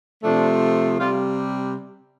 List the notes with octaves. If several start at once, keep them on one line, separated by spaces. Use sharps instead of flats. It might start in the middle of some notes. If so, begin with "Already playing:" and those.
C3 F3 A3 D4
C3 G3 F4